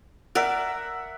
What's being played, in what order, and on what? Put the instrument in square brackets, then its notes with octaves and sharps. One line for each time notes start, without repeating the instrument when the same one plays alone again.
[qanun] A#4 D5 [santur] E5 F#5